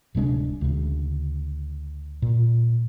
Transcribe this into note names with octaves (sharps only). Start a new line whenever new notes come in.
D1 C3 G#3 D4
D2 C#3
A#2